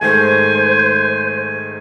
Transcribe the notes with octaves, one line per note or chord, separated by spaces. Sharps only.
G#2 D#3 A3 C5 G#5